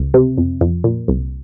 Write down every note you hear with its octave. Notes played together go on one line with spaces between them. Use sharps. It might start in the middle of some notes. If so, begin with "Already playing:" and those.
Already playing: C#2
C3
F2
F2
A#2
C2